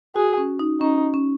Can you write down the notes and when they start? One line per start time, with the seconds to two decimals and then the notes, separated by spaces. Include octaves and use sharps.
0.15 F#4 G#4
0.38 C#4
0.59 D#4
0.81 C#4 D#4
1.14 C#4